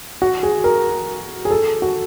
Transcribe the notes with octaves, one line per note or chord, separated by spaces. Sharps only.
F#4
G#4
A#4
G#4
A4
F#4